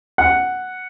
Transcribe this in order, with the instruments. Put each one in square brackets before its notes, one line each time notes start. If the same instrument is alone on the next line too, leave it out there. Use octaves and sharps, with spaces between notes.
[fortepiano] F#5